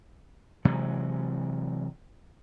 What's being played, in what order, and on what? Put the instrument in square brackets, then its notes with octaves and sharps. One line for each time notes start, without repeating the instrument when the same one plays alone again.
[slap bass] C3 E3 F#3 G#3